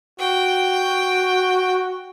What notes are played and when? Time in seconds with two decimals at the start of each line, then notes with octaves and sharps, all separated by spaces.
0.20 F#4 G5